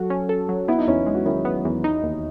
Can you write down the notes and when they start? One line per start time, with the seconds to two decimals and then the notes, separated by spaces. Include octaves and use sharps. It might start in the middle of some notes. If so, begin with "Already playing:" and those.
Already playing: F#3 F#4 A4
0.10 C#4
0.29 A4
0.49 F#3
0.68 B3 E4
0.78 D#4
0.87 E2 C#4 E4
1.06 G#3
1.15 F#4
1.26 D#3 C#4 E4
1.45 B3
1.65 E2
1.84 D#4
2.03 D#2